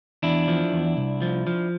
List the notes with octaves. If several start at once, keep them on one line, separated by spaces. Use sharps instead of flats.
E2 D4 E4
F3
E2
C2
F3
F3